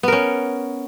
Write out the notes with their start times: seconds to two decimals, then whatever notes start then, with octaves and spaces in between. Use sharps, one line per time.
0.03 B3
0.08 A#4
0.12 C#4